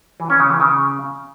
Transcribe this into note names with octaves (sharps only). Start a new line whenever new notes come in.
E3
C#4
C#3
E3
C#3